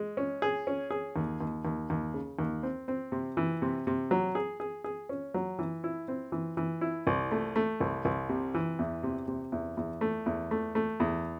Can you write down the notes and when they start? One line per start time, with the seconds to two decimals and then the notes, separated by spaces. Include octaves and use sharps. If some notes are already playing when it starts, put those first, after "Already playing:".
Already playing: G#3
0.17 C#4
0.42 G#4
0.67 C#4
0.90 G#4
1.16 D#2
1.41 D#2
1.65 D#2
1.90 D#2
2.14 C#3
2.39 D#2
2.63 C4
2.88 C4
3.12 C3
3.37 E3
3.62 C3
3.87 C3
4.11 F#3
4.35 G#4
4.60 G#4
4.84 G#4
5.09 C#4
5.34 F#3
5.59 E3
5.84 E4
6.08 C4
6.32 E3
6.57 E3
6.81 E4
7.07 C2
7.31 A3
7.56 A3
7.80 C2
8.05 C2
8.29 C3
8.55 E3
8.79 E2
9.03 C3
9.28 C3
9.52 E2
9.77 E2
10.01 A3
10.26 E2
10.51 A3
10.75 A3
11.00 E2